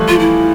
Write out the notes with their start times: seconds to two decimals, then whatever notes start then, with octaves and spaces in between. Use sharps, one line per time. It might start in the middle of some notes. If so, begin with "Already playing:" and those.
Already playing: E3 F3 G3 A3
0.09 F4
0.19 E4